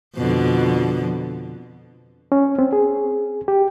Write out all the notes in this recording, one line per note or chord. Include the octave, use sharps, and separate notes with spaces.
F2 B2 D3
C#4
C4
G#4
G4